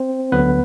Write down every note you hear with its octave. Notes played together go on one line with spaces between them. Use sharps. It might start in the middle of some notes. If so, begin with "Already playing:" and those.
Already playing: C4 C5
D2 D3 F#3 B3 B4